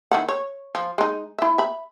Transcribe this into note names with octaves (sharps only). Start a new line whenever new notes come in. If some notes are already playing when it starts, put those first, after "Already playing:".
D#3 E4 F#5
C#5
F3
G#3 D#4
E4 E5
E5 B5